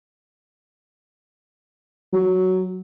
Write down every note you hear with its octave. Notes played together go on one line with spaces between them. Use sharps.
F#3